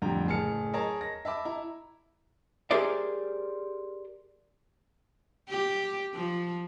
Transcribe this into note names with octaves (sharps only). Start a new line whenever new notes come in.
F2 A2 D3 G3 G5 A#5
F#1 A2 G#4 A5 F6 C#7
G#4 A#4 C#5 D#5 A5 A#5
A#6
E5 A5 B5 D6
E4 A#5
G4 G#4 A#4 C5 D5 E5
G4
F3